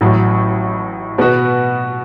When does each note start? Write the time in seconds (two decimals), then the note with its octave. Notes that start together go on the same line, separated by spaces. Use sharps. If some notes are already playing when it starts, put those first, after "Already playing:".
0.01 A1 A2 F#3
1.18 B2 B3 F#4 B4